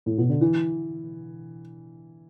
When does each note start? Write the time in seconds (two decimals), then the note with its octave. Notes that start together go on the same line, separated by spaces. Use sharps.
0.06 A2
0.18 B2
0.29 D3
0.41 E3